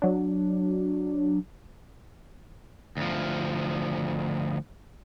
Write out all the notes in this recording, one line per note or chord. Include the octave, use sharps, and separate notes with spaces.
F#3 D4
D2 F3